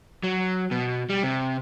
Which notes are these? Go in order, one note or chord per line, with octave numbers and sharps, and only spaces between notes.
F#3
B2
G3
C3